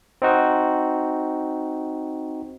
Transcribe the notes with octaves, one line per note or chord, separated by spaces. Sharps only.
C4 D#4 F#4